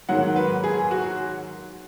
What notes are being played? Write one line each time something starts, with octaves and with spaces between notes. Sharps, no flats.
G#2 D#3 F#3 A#3 F#5
B4
G#4
F#4